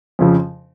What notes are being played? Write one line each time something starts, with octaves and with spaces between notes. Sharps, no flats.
F2 C#3 F3